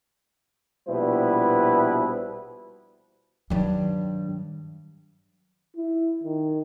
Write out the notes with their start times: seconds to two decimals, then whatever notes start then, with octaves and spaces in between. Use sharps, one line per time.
0.88 A#1 B2 G3 E4 B4 C5
3.50 G2 D#3 F#3 G3
5.77 E4
6.23 D#3